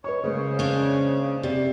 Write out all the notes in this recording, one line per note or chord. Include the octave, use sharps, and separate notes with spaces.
B4 C#5 D#5 C#6
C#3 G#3 A#3 G#4 C5
C#4 D4
C3 G4 D5